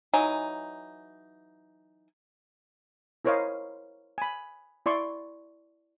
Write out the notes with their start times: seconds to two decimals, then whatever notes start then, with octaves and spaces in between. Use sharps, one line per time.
0.14 E3 F#3 D#4 G#5
3.25 E4 A#4 C5 C#5 D#5 F5
4.18 G#5 B5
4.86 E4 D5 C6 C#6